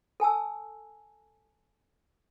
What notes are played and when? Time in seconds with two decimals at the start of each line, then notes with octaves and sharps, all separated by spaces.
0.20 A4 G#5 A5 E6